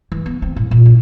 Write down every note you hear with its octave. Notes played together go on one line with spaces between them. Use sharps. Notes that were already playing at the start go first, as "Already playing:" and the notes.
E3
B3
C4
A2
A#2
A1